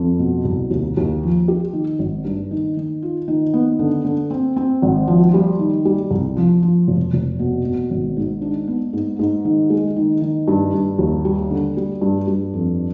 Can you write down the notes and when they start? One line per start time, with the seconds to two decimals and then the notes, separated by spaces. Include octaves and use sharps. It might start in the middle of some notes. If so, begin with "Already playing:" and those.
Already playing: F2
0.19 B2
0.45 C2
0.70 D#2
0.97 D#2
1.23 F3
1.48 G4
1.73 D#3
1.99 G#1
2.25 G2
2.51 D#3
2.77 D#3
3.02 F4
3.28 D#3
3.54 B3
3.79 D3
4.05 D3
4.31 C4
4.56 C4
4.82 G#1
5.08 F3
5.34 G3
5.59 D#3
5.85 G3
6.11 C2
6.36 F3
6.62 F3
6.88 F1
7.13 F1
7.39 B2
7.65 B2
7.90 G#1
8.17 G#2
8.42 D4
8.68 B3
8.93 G#2
9.19 G#2
9.45 D#3
9.70 G#3
9.96 D#3
10.22 D#3
10.48 G2
10.74 G2
10.98 D#2
11.25 G3
11.50 D3
11.77 G3
12.01 G2
12.27 G2
12.54 F2